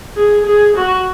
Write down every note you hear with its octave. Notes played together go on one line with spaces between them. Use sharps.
G#4
G#4
F#4